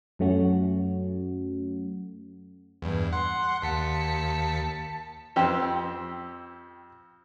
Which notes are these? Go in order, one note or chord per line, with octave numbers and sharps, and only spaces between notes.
F#2 F#3 A3 C#4 F#4
E2 G2
F#5 C6
D#2 A5 B6 C#7
F2 C4 G4 B4 G5